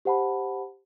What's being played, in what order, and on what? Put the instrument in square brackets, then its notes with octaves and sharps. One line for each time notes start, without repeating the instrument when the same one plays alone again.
[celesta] G4 C5 F#5 A5 B5